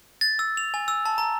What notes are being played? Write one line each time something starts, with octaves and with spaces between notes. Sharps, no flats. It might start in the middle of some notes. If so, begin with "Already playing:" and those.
A6
E6
F7
G#5
E6
A5
A#5